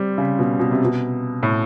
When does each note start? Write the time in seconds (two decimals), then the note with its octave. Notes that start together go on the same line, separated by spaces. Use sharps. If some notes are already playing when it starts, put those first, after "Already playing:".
Already playing: G3 C4
0.18 C#3
0.39 B2
0.59 B2
0.71 C3
0.84 B2
1.43 A2